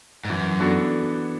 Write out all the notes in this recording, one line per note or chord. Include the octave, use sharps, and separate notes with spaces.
G#2
F#2 E3
B3 D4 F#4 A4